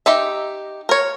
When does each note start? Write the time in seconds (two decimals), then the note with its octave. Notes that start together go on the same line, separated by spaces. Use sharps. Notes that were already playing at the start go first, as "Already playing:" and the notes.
0.06 D#4 G4 E5
0.89 A#4 C#5